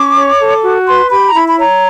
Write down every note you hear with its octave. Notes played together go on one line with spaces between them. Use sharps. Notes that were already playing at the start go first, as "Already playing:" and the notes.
Already playing: C#4 D6
C#5
A4
F#4
B4 C6
G4 B5
A#5
E4 B5
B5
C#5 A#5